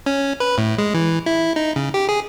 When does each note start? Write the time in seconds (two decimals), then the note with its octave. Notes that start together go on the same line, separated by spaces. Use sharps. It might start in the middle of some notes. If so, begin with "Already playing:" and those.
0.06 C#4
0.40 B4
0.58 A2
0.78 G#3
0.94 E3
1.26 E4
1.56 D#4
1.76 C#3
1.94 G4
2.09 G#4